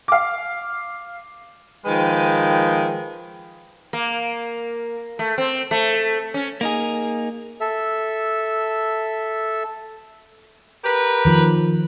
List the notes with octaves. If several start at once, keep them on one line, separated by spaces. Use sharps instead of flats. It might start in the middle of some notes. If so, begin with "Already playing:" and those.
F5 D6
D#3 F3 G#3 B4 G5
A#3
A3
C4
A3
C#4
A#3 D#4 G#4
A4 E5
G4 A#4 B4
D#3 F3